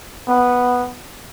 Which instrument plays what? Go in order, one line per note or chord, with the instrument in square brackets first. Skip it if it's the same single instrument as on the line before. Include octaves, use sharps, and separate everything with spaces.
[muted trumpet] B3